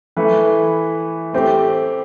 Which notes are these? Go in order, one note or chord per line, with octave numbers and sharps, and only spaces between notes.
E3 A3 E4 B4
A3 C4 G4